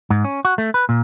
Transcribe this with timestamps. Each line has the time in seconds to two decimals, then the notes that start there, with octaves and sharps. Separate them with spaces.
0.10 G#2
0.24 C#4
0.45 F#4
0.58 A3
0.74 B4
0.89 A#2